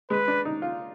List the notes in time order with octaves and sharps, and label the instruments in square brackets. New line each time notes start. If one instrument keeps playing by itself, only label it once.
[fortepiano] G#3 [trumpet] B4
[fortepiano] D4
D#4
F4